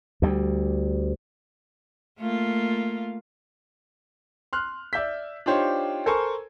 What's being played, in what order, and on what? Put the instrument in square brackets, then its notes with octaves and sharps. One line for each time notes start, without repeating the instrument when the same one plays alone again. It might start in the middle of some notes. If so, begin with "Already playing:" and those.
[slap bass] D2 G3
[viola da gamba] A3 A#3 F4
[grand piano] C6 F6 F#6
D5 E5 G6 B6
D4 D#4 F4 G4 C5 C#5
A4 A#4 C5 G#5 C#6